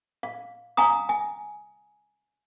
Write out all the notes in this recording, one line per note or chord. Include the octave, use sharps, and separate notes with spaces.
F5
F5 G#5 A#5 D#6
G#5